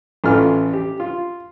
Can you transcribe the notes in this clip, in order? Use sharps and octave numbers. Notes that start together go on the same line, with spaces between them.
A1 E3 A3 F4 F6
G4
F4